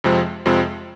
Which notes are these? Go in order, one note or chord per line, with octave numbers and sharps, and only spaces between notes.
F2 C3 F3 G#3 C4
F2 C3 F3 G#3 C4